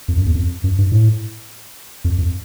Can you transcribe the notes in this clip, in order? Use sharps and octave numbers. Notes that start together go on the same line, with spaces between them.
F2
F#2
E2
F2
F#2
G2
A2
F2
F2